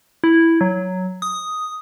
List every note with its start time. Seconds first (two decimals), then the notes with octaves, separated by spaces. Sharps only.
0.24 E4
0.61 F#3
1.22 D#6